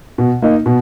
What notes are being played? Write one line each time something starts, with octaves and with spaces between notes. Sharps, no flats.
B2
A#3 D#4
B2